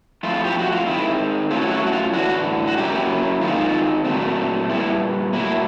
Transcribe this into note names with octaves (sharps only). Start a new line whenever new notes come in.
F3 A3 C4 E4 F4
G4
F#4
F4
D#3 G#3 C4 E4
F#3 A3 C#4 E4 F4
F4
F#4
F#4
F4
A2 E3 A3 D4 F#4
F#4
F#3 A#3 C#4 E4 G4
D#3 G#3 C4 D#4 F4
A#2 F#3 A3 C4
A#2 G3 B3 E4
A2 F#3 A#3 E4